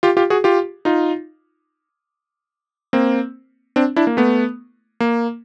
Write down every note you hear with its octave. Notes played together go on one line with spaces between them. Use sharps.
F4 G4
F4 G4
F#4 G#4
F4 G4
D#4 F4
A#3 C4
C4 D4
D4 E4
A#3
A3 B3
A#3